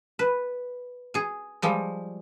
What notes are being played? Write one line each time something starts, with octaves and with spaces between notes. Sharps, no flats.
B4
G#4 G#5
F3 G3 G#3